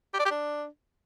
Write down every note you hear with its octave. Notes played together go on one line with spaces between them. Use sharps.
G4
D5
G4
D4